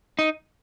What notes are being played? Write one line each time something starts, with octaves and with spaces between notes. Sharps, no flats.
D#4